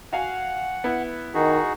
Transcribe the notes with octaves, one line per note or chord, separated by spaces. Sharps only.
F#4 F5 F#5 G#5
B3 E4
D#3 D#4 F#4 G#4